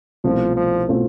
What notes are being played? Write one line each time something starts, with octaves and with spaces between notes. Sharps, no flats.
C2 B2 F3 A3 C4 F4
F3
B2 A3 C4 F4